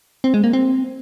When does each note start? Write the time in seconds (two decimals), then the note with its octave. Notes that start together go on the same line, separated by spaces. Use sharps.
0.24 C4
0.34 G#3
0.44 A#3
0.53 C4